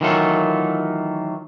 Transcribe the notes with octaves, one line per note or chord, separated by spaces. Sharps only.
D#3 E3 F#3 A3 F4 A4